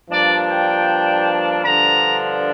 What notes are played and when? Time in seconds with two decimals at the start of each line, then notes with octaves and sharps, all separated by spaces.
0.10 G2 F3 A#3 D4 D5
0.48 G5
1.63 G2 D3 F3 D4 A#5